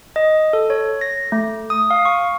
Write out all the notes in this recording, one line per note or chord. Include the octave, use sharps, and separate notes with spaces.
D#5
A4
C#5
A#6
A3
D#6
F5
C#6